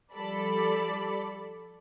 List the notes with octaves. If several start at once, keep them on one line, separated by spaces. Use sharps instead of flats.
F3 G3 A4 D5 B5